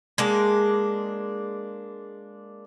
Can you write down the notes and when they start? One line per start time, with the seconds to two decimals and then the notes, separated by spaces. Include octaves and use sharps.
0.18 G#3 A#3 D4